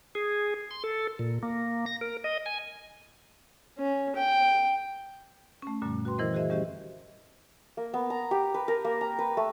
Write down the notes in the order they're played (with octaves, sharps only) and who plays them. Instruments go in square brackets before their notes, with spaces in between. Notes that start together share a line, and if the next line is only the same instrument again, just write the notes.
[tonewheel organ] G#4
C6
A4
A#2
A#3
A#6
A#4
D#5
G#5
[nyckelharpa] C#4
G5
[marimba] A3 C#4
F#2 A#2 D3 G3
F#4 B4 G5 C6
D#3 E3 E4 A#4 C5 D#5
F#4 G#4 C5 D#5 E5
G3 C#4 G4 C5 D#5 E5
[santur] A#3
B3
A#5
G4
B4
A#4
A#3
A#5
B4
A3